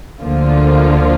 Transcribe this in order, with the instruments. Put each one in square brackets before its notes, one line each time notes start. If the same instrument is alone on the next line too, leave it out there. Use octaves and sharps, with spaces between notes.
[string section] D2 D3 F3 A#3 F4